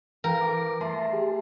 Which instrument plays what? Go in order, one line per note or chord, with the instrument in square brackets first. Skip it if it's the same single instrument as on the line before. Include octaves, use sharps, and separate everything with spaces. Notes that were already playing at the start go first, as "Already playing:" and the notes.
[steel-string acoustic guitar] E3 [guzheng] A#4 [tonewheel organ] F5 G5
[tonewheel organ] D6
[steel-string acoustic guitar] A3 [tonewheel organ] A5 C6
[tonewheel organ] G4 G#4